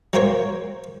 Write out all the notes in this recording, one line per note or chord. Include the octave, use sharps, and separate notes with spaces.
F#3 A#3 C5 C#5